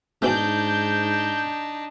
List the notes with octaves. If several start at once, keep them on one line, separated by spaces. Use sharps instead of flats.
G#2 B2 E3 A3 D4 D#4 G6